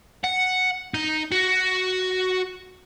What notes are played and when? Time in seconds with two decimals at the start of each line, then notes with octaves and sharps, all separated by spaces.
0.24 F#5
0.94 D#4
1.32 F#4